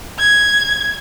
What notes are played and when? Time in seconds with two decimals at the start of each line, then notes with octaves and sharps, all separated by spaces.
0.19 G#6